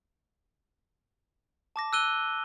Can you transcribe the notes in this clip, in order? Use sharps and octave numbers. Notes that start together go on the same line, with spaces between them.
A5 D6 A#6
E6 F#6 D#7 G7